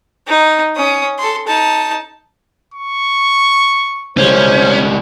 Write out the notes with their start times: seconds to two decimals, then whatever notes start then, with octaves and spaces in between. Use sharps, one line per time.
0.28 D#4
0.76 C#4 D#6
1.18 A4 C6
1.47 D#4 A5
2.74 C#6
4.17 C#2 G3 C#4 C5